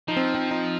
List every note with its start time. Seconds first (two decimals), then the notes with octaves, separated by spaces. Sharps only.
0.08 F3 D#4
0.17 C4
0.35 C4
0.51 D#4